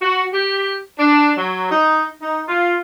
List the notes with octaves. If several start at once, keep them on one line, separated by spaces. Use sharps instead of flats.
F#4
G4
D4
F#3
D#4
D#4
F4